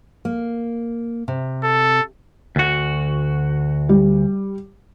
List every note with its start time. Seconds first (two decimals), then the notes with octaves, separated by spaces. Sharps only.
0.25 A#3
1.28 C3
1.63 A4
2.56 D2 F#4
3.89 G3